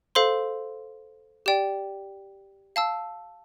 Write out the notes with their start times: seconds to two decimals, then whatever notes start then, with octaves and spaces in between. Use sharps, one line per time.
0.15 A4 C5 F5 C6
1.46 G4 D5 G5
2.76 F5 A5 E6